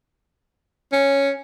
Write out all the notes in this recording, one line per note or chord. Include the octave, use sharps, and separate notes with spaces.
C#4